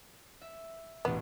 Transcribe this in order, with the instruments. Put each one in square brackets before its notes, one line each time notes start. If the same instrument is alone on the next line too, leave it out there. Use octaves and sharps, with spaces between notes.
[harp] E5
[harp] E1 A1 [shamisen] B3